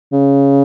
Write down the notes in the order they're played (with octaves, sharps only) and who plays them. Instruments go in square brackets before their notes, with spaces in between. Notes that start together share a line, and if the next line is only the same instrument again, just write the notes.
[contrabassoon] C#3